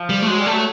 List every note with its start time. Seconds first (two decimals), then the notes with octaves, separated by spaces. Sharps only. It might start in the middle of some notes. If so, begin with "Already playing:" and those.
Already playing: F3
0.09 G3
0.22 A3
0.28 F#3 G#3
0.39 G3
0.46 A3
0.52 F#3